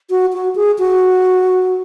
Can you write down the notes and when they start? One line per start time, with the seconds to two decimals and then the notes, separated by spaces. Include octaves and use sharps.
0.10 F#4
0.33 F#4
0.55 G#4
0.79 F#4